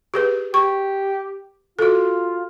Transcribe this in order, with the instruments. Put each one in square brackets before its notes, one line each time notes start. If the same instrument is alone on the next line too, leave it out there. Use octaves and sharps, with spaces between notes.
[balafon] G4 G#4 B4
[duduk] G4 [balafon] C#6
[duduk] F4 [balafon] F#4 A4